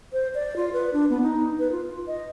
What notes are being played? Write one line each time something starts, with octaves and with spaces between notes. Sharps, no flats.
C5
D5
F4
B4
D4
B3
D#4
B4
F4
D#5